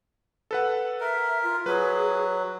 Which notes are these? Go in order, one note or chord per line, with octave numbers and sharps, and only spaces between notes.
A4 B4 F#5
A#4 E5
F4
F#3 G#4 B4